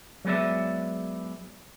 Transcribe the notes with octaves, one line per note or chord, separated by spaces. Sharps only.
F#3 G#3 B3 D5 E5